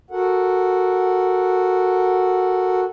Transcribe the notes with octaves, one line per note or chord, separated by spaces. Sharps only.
F#4 A4 A#4 F#5